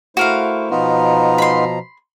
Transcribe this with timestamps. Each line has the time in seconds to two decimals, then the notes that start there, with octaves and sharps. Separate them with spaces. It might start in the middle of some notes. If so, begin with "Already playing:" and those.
0.17 A3 E4 F#4 A#4 C5 F5
0.71 B2 F3 B3 D#4 F4 A#5
1.38 B5 C6